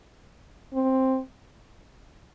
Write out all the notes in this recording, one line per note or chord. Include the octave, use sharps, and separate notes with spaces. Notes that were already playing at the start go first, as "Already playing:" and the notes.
C4